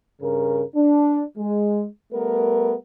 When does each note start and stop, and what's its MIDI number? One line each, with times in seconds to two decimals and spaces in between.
0.21 0.63 43
0.21 0.63 49
0.21 0.63 70
0.75 1.23 62
1.37 1.85 56
2.13 2.75 55
2.13 2.75 57
2.13 2.75 59
2.13 2.75 70